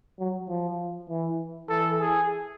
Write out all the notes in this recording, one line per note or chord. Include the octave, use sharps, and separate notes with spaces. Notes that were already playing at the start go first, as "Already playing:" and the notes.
F#3
F3
E3
E3 A4
G#4